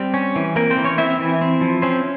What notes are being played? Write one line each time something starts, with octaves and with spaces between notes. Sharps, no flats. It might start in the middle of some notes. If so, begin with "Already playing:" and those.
Already playing: G3 C4 G4
C#4
E3
A#3 C4 A#4
C4 C5
E3
C#4 C#5
C4 E4 E5
E3
C4
F3
C4 C#4 C5